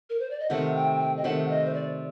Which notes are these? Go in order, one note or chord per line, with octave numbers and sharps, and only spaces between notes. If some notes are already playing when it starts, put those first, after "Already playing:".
A#4
C5
D5
D#5
C3 D#3 A3 F#5
G5
G5
D#5
C3 D#3 A3 F#5
D#5
C5
D5